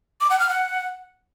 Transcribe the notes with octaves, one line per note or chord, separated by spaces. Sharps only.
D6
F#5
F6
F#5